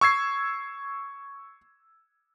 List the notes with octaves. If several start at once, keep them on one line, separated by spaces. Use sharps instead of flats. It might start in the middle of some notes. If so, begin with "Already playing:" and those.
C#6 E6 G#6 C7